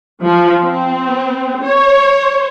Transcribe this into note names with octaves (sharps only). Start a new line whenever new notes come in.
F3
C4
C#5